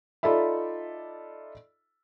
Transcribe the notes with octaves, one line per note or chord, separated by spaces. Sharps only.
D#4 F4 A4 D5 E5 B5